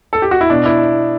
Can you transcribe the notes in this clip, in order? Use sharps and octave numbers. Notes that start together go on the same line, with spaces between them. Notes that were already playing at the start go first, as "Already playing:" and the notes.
A4
G4
F#4
E4
B2 D4
E4